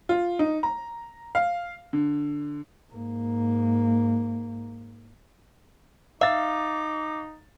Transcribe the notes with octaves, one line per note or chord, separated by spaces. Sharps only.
F4
D#4
A#5
F5
D3
G#2 A#3
D#4 E5 F5 D6 A6